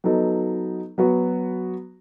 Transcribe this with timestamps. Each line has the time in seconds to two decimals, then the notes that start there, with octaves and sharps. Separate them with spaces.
0.04 F#3 B3 D#4 A4
0.98 F#3 B3 F#4